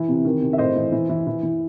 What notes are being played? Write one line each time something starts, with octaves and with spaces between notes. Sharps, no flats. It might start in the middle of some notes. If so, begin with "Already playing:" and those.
Already playing: E3
C3
D#3
C3
E5
A2 C5 D#5
E3
E3
E3
E3
E3